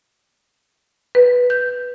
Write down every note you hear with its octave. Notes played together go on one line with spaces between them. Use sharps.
B4
G6